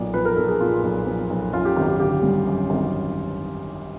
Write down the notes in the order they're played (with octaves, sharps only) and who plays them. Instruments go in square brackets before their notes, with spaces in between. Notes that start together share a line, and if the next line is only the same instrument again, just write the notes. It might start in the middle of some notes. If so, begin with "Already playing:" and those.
Already playing: [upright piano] B1 A#2 D5
F3 B4
A#4
B1 A4
G#4
A#2 F4
B1
F3
B1
F#2 F4
G4
G#1
G4
D3 G4
G3
F#2
G#1